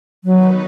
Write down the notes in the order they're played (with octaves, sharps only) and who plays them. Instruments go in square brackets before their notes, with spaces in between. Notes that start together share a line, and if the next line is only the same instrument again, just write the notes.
[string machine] D#3 B3 D#4 B4 [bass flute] F#3